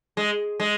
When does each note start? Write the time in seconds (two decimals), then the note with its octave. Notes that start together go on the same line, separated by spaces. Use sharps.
0.17 G#3
0.60 G#3